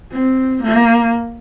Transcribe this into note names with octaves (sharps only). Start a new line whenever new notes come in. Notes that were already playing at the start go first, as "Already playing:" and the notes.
C4
A#3